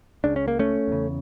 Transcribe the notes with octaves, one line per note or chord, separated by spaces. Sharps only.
C#2 C#3 D4
C#4
A#3
A3 C#4
E2 C#3